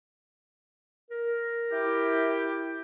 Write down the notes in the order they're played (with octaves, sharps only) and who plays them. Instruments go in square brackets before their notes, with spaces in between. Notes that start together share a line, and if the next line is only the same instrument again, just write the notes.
[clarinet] A#4
[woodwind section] E4 G4